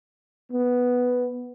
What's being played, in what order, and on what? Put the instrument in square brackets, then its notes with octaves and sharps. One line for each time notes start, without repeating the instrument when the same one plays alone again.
[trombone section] B3